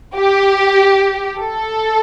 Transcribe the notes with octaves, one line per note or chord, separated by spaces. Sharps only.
G4
A4